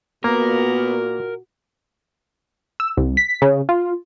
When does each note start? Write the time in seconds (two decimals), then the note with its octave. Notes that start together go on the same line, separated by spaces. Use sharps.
0.24 A#2 A#3 B3 F#4 A#4
2.80 E6
2.97 C2
3.17 B6
3.42 C#3
3.69 F4